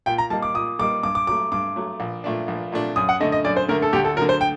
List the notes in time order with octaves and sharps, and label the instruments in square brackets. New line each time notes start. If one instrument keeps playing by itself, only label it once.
[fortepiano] A#2 [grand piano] G5
[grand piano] A#5
[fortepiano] G3 A#3 D#4 [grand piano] A5
[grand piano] D6
[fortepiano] A#2 [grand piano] D#6
[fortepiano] G3 A#3 D#4 [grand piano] D6
[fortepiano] G2 [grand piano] D6
[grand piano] D6
[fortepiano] F#3 [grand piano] D6
[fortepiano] A3
[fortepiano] G2 [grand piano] D6
[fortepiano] F#3 A3
A#1
A#2 A3 D4
A#1
A#2 A3 D4
[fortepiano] F#2 [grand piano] D#6
[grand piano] F#5
[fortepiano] D3 A3 [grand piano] D#5
[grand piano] D#5
[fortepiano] F#2 [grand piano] D5
[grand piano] C5
[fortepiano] D3 A3 [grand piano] A#4
[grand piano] A4
[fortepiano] D2 [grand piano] G4
[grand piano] A4
[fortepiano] F#3 [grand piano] A#4
[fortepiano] D3
[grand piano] C5
G5